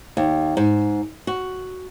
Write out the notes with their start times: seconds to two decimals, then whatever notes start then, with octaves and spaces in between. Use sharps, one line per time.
0.17 D#2
0.57 G#2
1.27 F#4